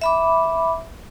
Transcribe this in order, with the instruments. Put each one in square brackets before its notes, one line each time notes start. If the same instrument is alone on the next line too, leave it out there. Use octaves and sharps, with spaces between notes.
[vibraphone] E5 B5 D6